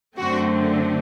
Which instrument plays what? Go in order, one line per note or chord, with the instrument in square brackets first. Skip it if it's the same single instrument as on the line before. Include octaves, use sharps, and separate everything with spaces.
[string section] F#2 D3 A3 C4 F#4